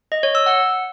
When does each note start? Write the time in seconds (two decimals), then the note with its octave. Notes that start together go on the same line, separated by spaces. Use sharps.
0.12 D#5
0.23 C#5
0.35 E6
0.46 F#5